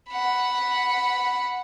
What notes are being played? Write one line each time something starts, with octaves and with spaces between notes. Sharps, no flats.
F#5 B5